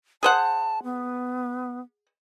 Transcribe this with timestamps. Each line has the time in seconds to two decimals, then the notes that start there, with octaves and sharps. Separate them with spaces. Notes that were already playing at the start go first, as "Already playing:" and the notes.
0.23 G#4 C5 F#5 A5
0.83 B3